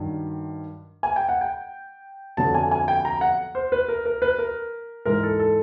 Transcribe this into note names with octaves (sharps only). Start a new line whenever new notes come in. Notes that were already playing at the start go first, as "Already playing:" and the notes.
Already playing: G2 D#3 F#3
G#5
G5
F#5
G5
F2 D3 F#3 B3 A5
G#5
G#5
G5
A#5
F#5
C5
B4
A#4
A#4
B4
A#4
G#2 E3 G#3 A#4
A4
A4